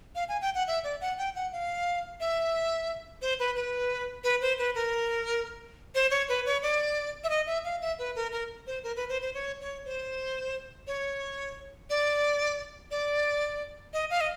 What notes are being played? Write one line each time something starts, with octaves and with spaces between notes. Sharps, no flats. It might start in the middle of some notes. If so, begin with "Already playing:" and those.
F5
G#5
G5
F#5
E5
D5
F#5
G5
F#5
F5
E5
C5
B4
B4
B4
C5
B4
A#4
C5
C#5
B4
C#5
D5
E5
D#5
E5
F5
E5
B4
A#4
A#4
C5
A#4
B4
C5
C5
C#5
C#5
C5
C#5
D5
D5
D#5
F5
D#5